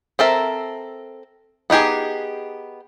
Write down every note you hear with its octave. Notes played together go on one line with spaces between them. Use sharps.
C4 A4 A#4 E5
B3 D#4 G4 G#4